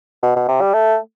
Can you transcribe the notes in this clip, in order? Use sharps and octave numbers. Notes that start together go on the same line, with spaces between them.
B2
B2
C3
G3
A3